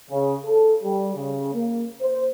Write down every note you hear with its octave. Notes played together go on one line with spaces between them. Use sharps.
C#3
A4
G3
C#3
A#3
C5